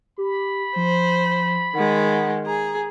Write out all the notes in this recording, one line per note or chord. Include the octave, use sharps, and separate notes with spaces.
G4 B5
F3 C5
D#3 G#3 F#5
G#4 A#5